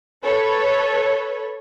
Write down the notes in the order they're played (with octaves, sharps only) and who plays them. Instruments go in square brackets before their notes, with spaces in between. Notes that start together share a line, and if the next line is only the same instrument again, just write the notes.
[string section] A4 B4 C#5